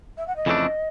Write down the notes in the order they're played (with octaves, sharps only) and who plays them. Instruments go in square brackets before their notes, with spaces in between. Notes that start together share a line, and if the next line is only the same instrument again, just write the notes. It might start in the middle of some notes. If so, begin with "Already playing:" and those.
[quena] E5
F#5
D#5
[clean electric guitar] F2 C#3 E3 A3 D4